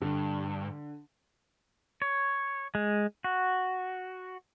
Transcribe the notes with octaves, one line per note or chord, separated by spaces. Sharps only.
G2 D3
C#5
G#3
F#4